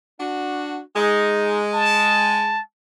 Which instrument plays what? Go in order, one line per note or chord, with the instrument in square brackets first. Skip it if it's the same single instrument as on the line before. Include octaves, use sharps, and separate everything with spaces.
[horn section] D4 F#4
[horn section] G#3 [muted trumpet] D#4
[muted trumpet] A5